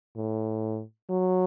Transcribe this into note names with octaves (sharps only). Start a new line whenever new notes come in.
A2
F#3